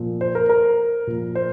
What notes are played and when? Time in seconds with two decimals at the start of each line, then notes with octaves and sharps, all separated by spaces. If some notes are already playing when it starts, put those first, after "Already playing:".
Already playing: A#2 F3
0.21 C5
0.35 A#4
0.49 A#4
1.07 A#2 F3
1.35 C5